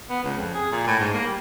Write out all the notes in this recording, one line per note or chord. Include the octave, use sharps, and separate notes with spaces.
B3
C#2
F2
G#4
A#2
A2
G#2
A#3
G3